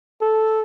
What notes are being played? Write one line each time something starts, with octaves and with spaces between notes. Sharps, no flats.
A4